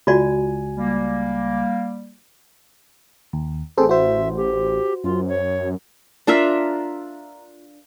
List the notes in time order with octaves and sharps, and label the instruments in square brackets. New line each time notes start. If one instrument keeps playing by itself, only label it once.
[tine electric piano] C#2 G#5 [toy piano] F4 F#4 D5
[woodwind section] G3 A#3
[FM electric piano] D#2
[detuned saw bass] A1 [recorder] C4 [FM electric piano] G#4 A4 C5
[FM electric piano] F#4 C5 [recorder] E5
[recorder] G4
[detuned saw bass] F#2 [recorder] F4
[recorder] C#5
[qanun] D4 F4 A#4 E5